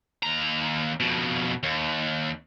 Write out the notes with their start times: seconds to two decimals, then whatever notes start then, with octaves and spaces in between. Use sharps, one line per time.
0.23 D#2 A#5
1.00 F2 B2
1.63 D#2